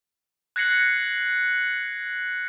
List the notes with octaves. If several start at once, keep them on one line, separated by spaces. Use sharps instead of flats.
F#6 G#6 A#6 C7 C#7 F#7